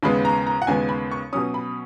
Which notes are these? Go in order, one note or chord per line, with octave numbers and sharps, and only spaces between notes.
D#2 C#3 G#3 B3 B5
A#5
A#5
F#5
D#2 C#3 G#3 B3 G#5
B5
C#6
B2 F#3 C#4 D#6
B5